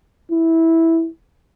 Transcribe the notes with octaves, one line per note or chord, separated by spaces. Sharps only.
E4